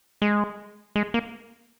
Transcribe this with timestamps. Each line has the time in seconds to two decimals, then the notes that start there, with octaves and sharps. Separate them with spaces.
0.22 G#3
0.96 G#3
1.14 A#3